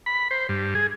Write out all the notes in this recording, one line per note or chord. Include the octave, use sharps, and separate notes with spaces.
B5
C5
G2
G#4